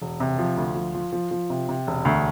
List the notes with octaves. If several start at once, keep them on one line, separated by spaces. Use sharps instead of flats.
E1
C3
F3
D2
F3
F3
F3
F3
C3
C3
E1
D2